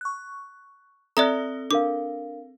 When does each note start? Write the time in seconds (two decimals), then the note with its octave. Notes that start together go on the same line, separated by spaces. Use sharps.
0.01 C#6 F#6
1.17 C4 A4 D5 E5 A#5 D#6 F#6
1.71 D4 A#4 F5 D6